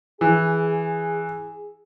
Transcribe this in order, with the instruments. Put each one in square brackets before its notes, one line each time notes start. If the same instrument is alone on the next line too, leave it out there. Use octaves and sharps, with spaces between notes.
[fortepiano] E3 [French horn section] G#4